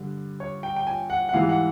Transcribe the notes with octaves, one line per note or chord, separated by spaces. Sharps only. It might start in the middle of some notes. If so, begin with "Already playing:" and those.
Already playing: G2 D3
C#5
G5
G5
G#5
F#5
F#5
G#2 E3 G3 F5
F#5